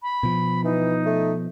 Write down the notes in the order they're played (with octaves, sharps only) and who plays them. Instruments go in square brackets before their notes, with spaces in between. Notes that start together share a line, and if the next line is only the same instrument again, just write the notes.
[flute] B5
[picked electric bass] B2 F3
[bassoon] E3 [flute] D#4
[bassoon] A3